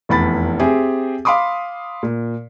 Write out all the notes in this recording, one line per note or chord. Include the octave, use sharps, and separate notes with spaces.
F1 E2 B5 A6
C4 G4 G#4 E5 G#5
F5 B5 C6 D6 D#6
A#2